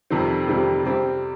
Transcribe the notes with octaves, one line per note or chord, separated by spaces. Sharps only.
F2 C3 D#3 G3 C4
F2 C3 D#3 G3 C4
C3 G3 C4